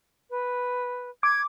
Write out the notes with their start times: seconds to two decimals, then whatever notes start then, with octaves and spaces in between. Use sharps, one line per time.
0.30 B4
1.23 D6 G#6